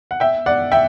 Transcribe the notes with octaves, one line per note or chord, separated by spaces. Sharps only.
F#5
E5 G5
D5 F#5
E5 G5